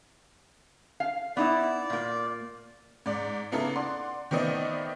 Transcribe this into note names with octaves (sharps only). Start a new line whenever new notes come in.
F5
B3 D#4 E4 D5
A#2 A#3
G#2 D5
C#3 A#3 B3 D#4 E4 A4
D5 F#5 C6
D#3 A3 B3 C4 D5 D#5